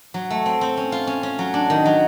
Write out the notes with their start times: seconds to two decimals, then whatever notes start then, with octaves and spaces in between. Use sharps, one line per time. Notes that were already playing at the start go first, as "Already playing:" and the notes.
0.14 F#3
0.30 A3
0.46 C4
0.61 C4
0.77 C#4
0.92 F4
1.07 C#4
1.23 C#4
1.39 F#3
1.54 D4
1.70 D#3
1.85 F#3